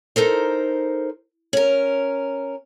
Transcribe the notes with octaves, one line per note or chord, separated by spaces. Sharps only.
D#4 A4 A#4 C5
C#4 A#4